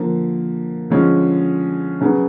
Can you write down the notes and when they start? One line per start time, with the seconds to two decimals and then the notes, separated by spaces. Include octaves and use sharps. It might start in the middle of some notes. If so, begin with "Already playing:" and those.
Already playing: D3 F3 A#3
0.90 D3 F3 G#3 C#4
2.01 C#3 F#3 B3